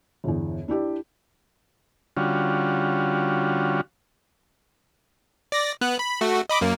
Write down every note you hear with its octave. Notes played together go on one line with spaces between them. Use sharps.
G1 E2
D4 E4 G4 D5
D3 G3 C#4 F4 F#4
D5 A#6
B3 F#6
B5
A3 F#4
D#5 B5 D6
F#2 A#3